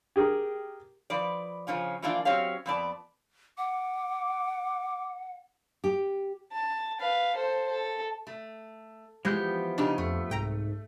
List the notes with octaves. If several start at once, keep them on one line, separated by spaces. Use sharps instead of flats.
G4 G#4 A#4
F3 B4 D5
C#3 F3 C#4 F4
E3 F3 A#3 D4 F4 D5
F#3 C4 C#4 G4 C#5 F5
F2 B3 D5 A5
F#5 D6
G4
A5
B4 F5
A4 C5
A4
A3
E3 F3 G#3 B3 G4 G#4 G6
C#3 D4 D#4 G4
F2 A3
C2 G#2 G5 A#5